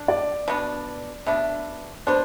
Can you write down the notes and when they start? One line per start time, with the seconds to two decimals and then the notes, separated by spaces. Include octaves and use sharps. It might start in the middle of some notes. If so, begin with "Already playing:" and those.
Already playing: D4
0.08 D5
0.48 B2 B3 D4
1.26 B2 B3 D4 E5
2.07 B2 B3 D4 C5